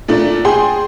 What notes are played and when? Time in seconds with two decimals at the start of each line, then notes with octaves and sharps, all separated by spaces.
0.08 A#2 A3 D4
0.45 G#4 G5 C6